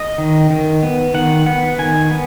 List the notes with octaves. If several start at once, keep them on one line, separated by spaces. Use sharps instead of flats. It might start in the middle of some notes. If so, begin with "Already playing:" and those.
Already playing: D#5
D#3
D#3
B3
D#3 F#5
B3 F#5
D#3 G#5
B3